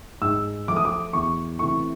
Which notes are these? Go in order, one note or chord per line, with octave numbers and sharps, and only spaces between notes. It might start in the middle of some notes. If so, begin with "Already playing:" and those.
G#2 E6
F3 A3 D6 D#6
D6
E2 C#6
C3 E3 A3 C#6